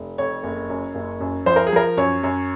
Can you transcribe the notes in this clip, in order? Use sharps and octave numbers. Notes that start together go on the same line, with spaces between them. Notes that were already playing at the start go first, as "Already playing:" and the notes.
Already playing: F1
F2 C#5
F#1
F#2
F#1
F#2
F3 C5
A#4
G#4
F3 A#4
F#2 C#5
F#2